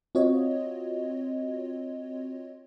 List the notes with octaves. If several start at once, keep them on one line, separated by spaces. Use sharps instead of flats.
C4 F4 F#4 C#5 D#5